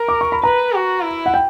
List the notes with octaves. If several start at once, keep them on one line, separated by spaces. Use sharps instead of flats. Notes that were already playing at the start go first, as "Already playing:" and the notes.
Already playing: A#4
D6
C#6
B5
B4 A#5
F#4
E4
F#5
G5